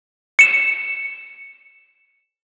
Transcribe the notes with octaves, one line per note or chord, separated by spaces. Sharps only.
C#7 E7